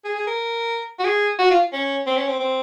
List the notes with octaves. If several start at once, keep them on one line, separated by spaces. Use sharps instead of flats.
G#4
G#4
A#4
F#4
G#4
F#4
F4
C#4
C4
C#4
C4
C4